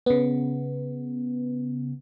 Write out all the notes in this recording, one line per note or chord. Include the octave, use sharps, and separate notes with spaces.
C#3 B3